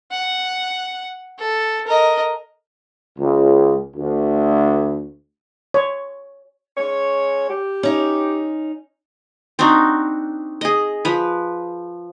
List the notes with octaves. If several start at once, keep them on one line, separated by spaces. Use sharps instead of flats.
F#5
A4
A#4 D#5
C#2
D2
C#5
G#3 C#4 C#5
G4
C#4 D#4
C4 D4 D#4 F#4
G#4 D#5
F3 B4